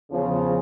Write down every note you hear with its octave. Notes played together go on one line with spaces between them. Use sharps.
E2 C#3 F3